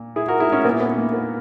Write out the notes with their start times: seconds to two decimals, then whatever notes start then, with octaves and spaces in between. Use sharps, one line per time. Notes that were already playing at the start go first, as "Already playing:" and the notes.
Already playing: A#2
0.16 E4 G#4
0.28 F#4 A#4
0.40 E4 G#4
0.52 C#4 E4
0.64 A#2 B3
0.81 B3
0.98 A#3
1.14 B3